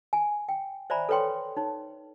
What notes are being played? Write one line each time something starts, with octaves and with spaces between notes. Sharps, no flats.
G#5
G5
C5 D5 E5 G#5 A#5 B5
A4 B4 C#5 G5 C6
D#4 C#5